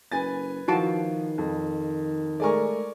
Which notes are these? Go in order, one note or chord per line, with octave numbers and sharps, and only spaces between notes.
F#1 B4 G#5 A6
D#3 F3 E4 F#4 A5 C7 D7
F2
G#3 A3 A#4 D5 G#5 C#6